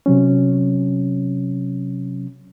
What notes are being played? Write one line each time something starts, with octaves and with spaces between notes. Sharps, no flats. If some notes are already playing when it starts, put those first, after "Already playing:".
C3 F#3 C#4